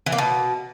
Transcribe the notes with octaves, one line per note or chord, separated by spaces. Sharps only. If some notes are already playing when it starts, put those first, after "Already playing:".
E3
A#3
B2